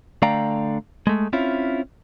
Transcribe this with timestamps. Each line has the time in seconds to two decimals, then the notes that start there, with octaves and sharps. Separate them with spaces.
0.22 D3 A3 D5 F5 G5 A#5
1.07 G#3 A3
1.33 C4 C#4 E4 F4